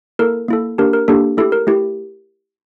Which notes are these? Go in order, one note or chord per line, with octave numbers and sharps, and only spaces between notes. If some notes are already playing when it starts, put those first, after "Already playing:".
A#3 E4 A4 A#4
A#3 E4 A4
A#3 D4 G4 A#4
A#4
A#3 D4 G4 A4
A3 E4 G4 A4
A#4
A3 E4 G4